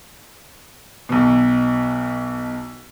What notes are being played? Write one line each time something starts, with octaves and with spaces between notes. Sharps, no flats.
B1 B2